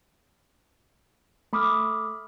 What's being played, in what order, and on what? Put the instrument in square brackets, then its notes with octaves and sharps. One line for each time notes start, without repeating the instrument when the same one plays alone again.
[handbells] A3 B5 D6 D#6 F6